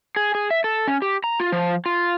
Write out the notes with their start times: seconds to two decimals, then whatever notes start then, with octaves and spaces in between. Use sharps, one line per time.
0.16 G#4
0.35 G#4
0.51 E5
0.64 A4
0.87 C#4
1.02 G4
1.24 A#5
1.40 F4
1.52 F3
1.86 F4